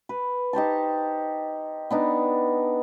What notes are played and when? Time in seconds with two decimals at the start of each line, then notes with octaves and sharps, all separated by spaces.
0.09 B4
0.53 D#4 G4 C5 A5
1.90 B3 D4 D#4